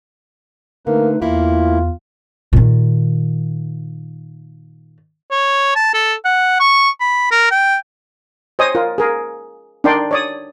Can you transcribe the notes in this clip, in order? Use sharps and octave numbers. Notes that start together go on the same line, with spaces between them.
D3 A3 A#3 D#4 B4
E2 E3 A#3 E4 F4
A#2 D#3
C#5
A5
A4
F#5
C#6
B5
A#4
G5
C5 C#5 D#5 G#5 D#6
F4 A#4
G#4 A#4
D4 D#4 A#4 D5 G5 C6
C#5 D5 D#6